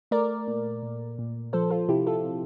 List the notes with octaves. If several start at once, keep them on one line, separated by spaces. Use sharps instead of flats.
A3 A#4 D5
A#2
A#2
A#2
F3 A4 C5
F4 A4
C3 E4 G4
F4 A4
C3